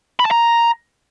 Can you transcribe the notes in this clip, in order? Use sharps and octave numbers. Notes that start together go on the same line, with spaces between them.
B5
A5
A#5